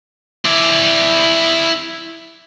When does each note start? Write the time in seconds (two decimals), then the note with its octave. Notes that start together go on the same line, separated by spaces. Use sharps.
0.45 E4 D5